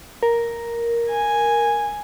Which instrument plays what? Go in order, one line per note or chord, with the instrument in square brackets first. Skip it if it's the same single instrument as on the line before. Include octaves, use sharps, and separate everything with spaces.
[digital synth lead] A#4
[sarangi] G#5